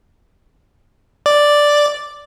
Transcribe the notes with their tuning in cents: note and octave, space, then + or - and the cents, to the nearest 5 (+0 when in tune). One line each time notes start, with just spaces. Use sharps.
D5 +0